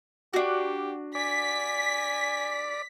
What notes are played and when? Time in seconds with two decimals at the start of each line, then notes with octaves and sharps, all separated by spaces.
0.34 D4 F#4 G4
1.15 D5 G#5 B6